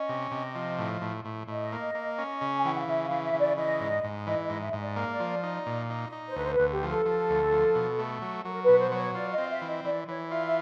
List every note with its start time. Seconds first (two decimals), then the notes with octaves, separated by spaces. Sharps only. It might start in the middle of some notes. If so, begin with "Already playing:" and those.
Already playing: C#4 D#5
0.09 C3
0.31 C3
0.55 F3
0.79 A2
1.01 A2
1.25 A2
1.48 A2 D#5
1.72 A#3
1.95 A#3
2.18 C#4
2.41 C#3
2.56 G#5
2.64 E3 G5
2.71 F#5
2.79 F5
2.87 C#3 E5
3.05 F5
3.11 E3
3.23 E5
3.34 C#3
3.40 D5
3.57 E3 D#5
3.81 G#2
4.04 G#2
4.27 E3 D#5
4.45 D#5
4.50 G#2
4.61 E5
4.73 G#2
4.79 D5
4.96 A#3
5.20 F3
5.43 D#4
5.66 A#2
5.90 D#4
6.12 D#4
6.28 C5
6.36 D2 B4
6.44 C5
6.53 B4
6.60 D2
6.71 G4
6.83 F3 A4
7.06 F3
7.30 D2
7.52 F3
7.75 B2
7.99 A3
8.22 F#3
8.45 F#3 A#4
8.63 B4
8.68 B2
8.80 C5
8.92 F#3
8.97 C#5
9.14 F4 D5
9.33 D#5
9.38 C4
9.50 E5
9.62 E3
9.67 D#5
9.85 E3 D5
10.08 E3 C#5
10.31 F4 E5
10.45 E5